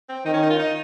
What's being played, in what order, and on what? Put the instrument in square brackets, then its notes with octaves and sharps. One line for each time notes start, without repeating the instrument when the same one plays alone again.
[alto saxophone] C4
[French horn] D#3 [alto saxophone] D#4
[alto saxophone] C#4
D#4
F4
D#4